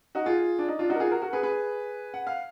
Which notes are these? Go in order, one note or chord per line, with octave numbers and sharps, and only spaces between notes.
D#4 F#4
F4 G#4
D4
D#4
D4 F4
D#4 F#4
A#4
F4 G#4
F#4 A#4
F#4 A#4
G#4 B4
G#4 B4
F#5
F5